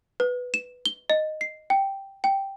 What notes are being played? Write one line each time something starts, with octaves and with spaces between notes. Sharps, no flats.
B4
E7
G7
D#5
C7
G5
G5